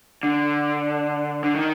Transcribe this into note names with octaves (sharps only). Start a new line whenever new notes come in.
D3
D3
D#3